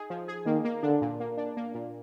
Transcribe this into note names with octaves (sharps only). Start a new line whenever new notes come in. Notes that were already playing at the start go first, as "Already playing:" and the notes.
Already playing: D#4 G#4
F3
G#4
D#3 A#3
A#3
D3 D4
A#2
A#3
D4
A#3
A#2